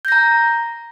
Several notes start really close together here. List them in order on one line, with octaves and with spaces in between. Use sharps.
G6 A#6 A#5